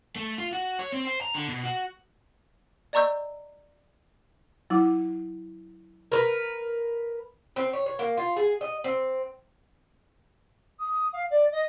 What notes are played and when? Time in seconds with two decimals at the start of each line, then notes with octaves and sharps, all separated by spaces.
0.16 A3
0.38 F4
0.53 F#4
0.79 C#5
0.93 C4
1.05 C5
1.21 A#5
1.34 D3
1.48 B2
1.63 F#4
2.93 D5 D#5 A#5 C#6 E6 G6
4.70 F#3 E4 D6
6.12 A#4 B4
7.56 C4
7.73 C#5
7.86 C#5
7.99 A#3
8.17 F4
8.36 G#4
8.61 D#5
8.84 C4
10.79 D#6
11.13 F5
11.30 D5
11.52 D#5